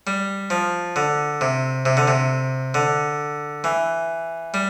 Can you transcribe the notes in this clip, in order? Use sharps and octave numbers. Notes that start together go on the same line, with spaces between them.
G3
F3
D3
C3
C3
D3
C3
D3
E3
G3